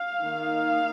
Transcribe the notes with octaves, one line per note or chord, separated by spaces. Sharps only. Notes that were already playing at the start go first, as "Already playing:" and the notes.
Already playing: F5
D#3 A#3 D#4